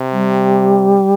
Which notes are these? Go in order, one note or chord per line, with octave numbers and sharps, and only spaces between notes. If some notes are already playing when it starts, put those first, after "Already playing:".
Already playing: C3
G3